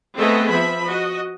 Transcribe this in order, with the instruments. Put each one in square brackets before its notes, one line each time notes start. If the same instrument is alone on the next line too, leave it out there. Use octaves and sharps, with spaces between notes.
[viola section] A3 B3 C4 G#4 A4 D#5
F3 E5 B5
F#4 D#5